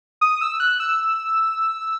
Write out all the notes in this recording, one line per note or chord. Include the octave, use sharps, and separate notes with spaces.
D#6
E6
F#6
E6